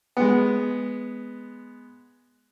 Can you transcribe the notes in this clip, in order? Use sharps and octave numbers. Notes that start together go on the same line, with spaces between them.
G#3 B3